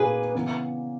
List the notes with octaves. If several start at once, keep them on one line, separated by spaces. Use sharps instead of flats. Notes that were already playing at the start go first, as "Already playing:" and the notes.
Already playing: A#2 A#3 D#4 F#4 G#4 B4
C#3 E3 B3